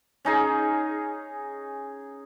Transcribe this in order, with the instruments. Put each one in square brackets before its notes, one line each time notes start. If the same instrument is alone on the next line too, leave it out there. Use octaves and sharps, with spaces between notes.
[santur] C#4 D#4 G#4